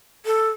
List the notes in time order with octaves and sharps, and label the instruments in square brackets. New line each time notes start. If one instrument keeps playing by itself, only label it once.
[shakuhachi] A4